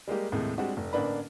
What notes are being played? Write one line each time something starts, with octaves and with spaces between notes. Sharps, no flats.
G3 G#3 A#3 G4
D#2 A2 C3 G#3
G3 G#3 C4 D4 F#4 G4
F1
A1 D3 A#3 D4 B4 B5